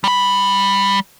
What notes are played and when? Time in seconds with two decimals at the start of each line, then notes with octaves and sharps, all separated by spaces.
0.04 G3 B5